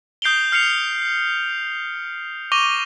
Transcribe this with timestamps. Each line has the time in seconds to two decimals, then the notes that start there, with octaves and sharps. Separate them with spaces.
0.22 D#6 G6 C7 D7 F7 G7
0.52 F6 C7 C#7 F7
2.52 C#6 D6 A#6 D#7 F7 G7